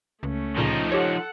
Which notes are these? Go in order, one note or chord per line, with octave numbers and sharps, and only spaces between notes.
C#2 A3 C#4
D2 A#2 C#3 F3 D#4
G4 A4 C#5 F#5